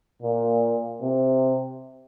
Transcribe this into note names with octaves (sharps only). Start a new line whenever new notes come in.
A#2
C3